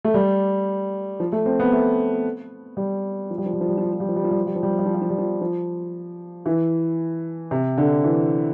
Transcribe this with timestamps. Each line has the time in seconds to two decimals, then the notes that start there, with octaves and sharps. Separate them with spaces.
0.04 A3
0.14 G3
1.20 F3
1.32 A3
1.46 C4
1.60 B3
1.73 A3
2.77 G3
3.30 F3
3.38 G3
3.46 F3
3.53 G3
3.61 F3
3.69 G3
3.78 F3
3.85 G3
3.93 F3
4.00 G3
4.09 F3
4.16 G3
4.24 F3
4.31 G3
4.40 F3
4.47 G3
4.56 F3
4.63 G3
4.70 F3
4.79 G3
4.86 F3
4.94 G3
5.01 F3
5.10 G3
5.18 F3
5.41 F3
6.46 E3
7.51 C3
7.78 D3
8.04 E3